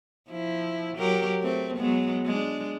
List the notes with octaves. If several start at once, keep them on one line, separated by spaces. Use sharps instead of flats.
F3 E4
F#3 G4 A#4
A3 C4
F#3 G#3 B3
G#3 D4